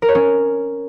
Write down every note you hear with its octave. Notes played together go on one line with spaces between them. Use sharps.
A#4
C#5
C#4